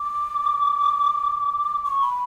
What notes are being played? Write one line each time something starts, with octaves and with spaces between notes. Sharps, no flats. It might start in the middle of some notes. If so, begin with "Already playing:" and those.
Already playing: D6
C#6
B5